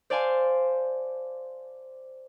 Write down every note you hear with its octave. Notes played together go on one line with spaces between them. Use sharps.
C5 D5 F5 G#5 A5 C6